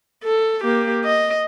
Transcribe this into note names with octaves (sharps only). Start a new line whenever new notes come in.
A4
A#3 G4
D#5